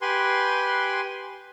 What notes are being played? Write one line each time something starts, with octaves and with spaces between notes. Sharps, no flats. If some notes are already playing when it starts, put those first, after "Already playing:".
G4 B4 G#5 C6